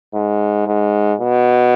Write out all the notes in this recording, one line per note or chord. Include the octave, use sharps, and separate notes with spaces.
G#2
G#2
B2